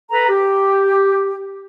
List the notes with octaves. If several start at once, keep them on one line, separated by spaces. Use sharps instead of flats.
A4 B4 A#5
G4